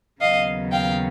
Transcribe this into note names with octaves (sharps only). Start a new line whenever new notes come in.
D#2 C#3 F#3 B3 D#5 F5
F5 G5